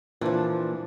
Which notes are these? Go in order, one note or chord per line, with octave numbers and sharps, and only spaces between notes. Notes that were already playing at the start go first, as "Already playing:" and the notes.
A#2 E3 F3 D4